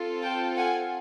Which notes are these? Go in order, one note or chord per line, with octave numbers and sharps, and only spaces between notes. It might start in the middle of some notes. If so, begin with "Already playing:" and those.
Already playing: C4 F4 A4
G5 A5
F#5 G#5